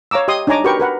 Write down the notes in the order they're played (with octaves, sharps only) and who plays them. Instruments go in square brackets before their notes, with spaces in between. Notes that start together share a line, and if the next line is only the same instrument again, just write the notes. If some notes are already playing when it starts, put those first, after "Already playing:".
[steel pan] C#5 F5 A#5 D6 E6
G4 D#5 C6 D#6
D4 D#4 C#5 G#5 A#5 D6
F#4 G4 A#4 B4 G5 C#6
A#4 B4 F#5